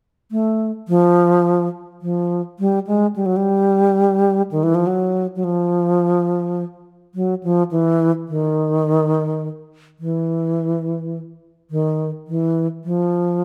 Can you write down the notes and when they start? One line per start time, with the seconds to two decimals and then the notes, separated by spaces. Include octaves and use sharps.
0.31 A3
0.88 F3
2.02 F3
2.59 G3
2.87 G#3
3.16 G3
3.26 F#3
3.36 G3
4.51 D#3
4.63 E3
4.75 F3
4.87 F#3
5.36 F#3
5.44 F3
7.15 F#3
7.43 F3
7.71 E3
8.28 D#3
9.99 E3
11.71 D#3
12.28 E3
12.85 F3